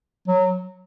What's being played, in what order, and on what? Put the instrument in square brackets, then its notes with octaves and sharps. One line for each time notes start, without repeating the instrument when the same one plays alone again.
[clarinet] F#3